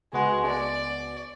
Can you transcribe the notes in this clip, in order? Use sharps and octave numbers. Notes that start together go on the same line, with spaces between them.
C#2 G#3 B3 F#4
D5